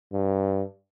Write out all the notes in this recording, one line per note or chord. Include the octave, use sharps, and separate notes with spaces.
G2